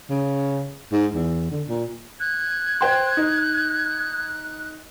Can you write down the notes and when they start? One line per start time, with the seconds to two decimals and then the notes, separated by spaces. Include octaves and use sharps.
0.10 C#3
0.92 G#2
1.14 E2
1.51 D3
1.68 A#2
2.20 F#6 G#6
2.81 C5 G5 C6
3.17 D#4